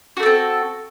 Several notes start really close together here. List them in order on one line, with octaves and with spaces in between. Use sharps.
F#4 A3 A4 C4